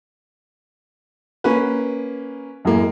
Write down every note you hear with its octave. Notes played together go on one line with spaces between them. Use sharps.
A#3 C#4 B4
F#2 A2 G#3 A#3